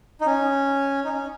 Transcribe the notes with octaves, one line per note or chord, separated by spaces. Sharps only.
D#4
C#4
D#4
C#4